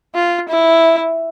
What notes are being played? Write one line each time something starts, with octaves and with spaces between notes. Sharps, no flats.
F4
E4